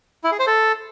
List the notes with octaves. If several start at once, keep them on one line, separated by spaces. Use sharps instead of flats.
E4
G#4
C5
A4